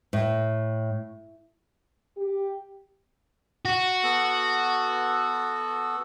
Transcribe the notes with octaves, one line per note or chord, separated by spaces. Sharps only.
A2
G4
F#4
B3 A4